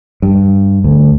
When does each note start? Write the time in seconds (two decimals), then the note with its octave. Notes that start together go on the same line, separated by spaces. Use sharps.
0.22 G2
0.84 D2